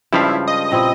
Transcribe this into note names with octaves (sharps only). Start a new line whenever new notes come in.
G2 C#3 F3 G3 G#3 E4 F5
D#5
A#2 C4 E4